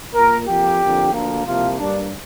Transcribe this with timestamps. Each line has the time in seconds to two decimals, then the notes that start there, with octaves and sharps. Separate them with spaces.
0.14 A#2 A#3 A#4
0.47 F2 F3 A#3 G4
0.80 F2 D3 A#3
1.12 D2 D3 F3 A#3
1.45 C2 C3 F3 A#3 F4
1.77 G2 G3 A#3 D4